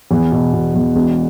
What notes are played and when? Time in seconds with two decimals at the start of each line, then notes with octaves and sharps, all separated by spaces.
0.11 E2
0.32 B2
0.53 B2
0.74 E2
0.95 E1